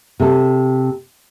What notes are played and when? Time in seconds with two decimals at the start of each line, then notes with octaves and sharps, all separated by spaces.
0.20 C3 A4